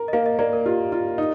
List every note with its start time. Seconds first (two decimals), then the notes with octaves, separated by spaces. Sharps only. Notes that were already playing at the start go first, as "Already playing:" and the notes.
Already playing: A#4
0.08 D#5
0.13 A#3 F5
0.26 D#5
0.39 A#3 D5
0.53 A#4
0.66 F4 G4
0.92 F4
1.18 D#4